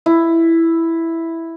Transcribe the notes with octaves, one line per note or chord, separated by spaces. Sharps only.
E4